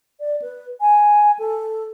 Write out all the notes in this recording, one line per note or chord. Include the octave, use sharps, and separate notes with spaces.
D5
B4
G#5
A4